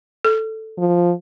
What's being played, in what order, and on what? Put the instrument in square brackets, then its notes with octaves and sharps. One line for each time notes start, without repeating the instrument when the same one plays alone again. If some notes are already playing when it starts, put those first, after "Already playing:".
[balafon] A4
[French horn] F3